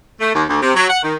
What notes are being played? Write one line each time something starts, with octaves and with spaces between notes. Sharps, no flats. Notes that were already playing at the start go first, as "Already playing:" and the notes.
A3
D#2
D2
C3
F#3
F#5
D#3